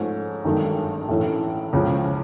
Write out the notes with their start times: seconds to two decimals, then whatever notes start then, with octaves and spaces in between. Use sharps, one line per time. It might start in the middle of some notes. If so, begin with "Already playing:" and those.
Already playing: G#2 F3 A3 C#4
0.45 G#1 G2 D#3 F#3 A3
1.09 A1 A2 E3
1.73 C#2 C#3 F3